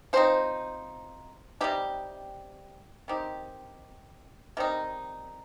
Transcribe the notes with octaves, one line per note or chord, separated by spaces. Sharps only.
F3 C4 D#4 C5
C3 G3 C4 D#4 G4
D#3 C4 D#4 G4
D#3 G3 C4 D#4